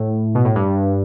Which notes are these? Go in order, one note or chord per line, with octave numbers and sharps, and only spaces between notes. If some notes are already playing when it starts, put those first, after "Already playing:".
Already playing: A2
B2
A2
G2